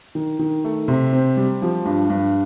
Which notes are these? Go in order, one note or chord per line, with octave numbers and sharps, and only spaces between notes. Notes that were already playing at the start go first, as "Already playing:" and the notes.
D#3
D#3
A3
C3
C4
G3
F3
G2
G2